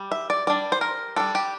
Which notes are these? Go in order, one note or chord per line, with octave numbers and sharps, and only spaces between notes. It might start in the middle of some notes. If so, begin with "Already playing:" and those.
Already playing: G3
E5
D5
G3 D4 D5
C5
A#4
G3 D4 A4
G4